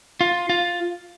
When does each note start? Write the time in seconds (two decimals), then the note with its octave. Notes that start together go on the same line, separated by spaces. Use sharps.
0.21 F4
0.49 F4